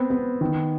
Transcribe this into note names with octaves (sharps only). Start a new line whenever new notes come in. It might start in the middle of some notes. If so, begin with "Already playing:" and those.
Already playing: B3 C4
B3
D#3